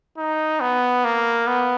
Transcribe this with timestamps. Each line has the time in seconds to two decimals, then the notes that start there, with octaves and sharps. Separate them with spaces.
0.18 D#4
0.61 B3
1.04 A#3
1.47 B3